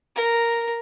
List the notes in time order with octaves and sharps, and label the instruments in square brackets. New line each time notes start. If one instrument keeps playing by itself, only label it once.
[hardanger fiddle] A#4